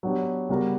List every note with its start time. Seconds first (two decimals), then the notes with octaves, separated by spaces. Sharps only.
0.03 F#3 B3 D4 G4
0.49 C#3 G3 B3 F#4 A#4